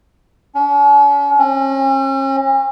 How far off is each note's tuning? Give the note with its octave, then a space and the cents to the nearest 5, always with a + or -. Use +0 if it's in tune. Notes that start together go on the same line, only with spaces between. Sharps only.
C#4 +45
C#4 -40